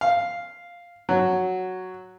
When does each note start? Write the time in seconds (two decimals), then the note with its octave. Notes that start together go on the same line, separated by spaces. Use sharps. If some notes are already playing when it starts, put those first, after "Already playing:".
0.01 F5
1.09 F#3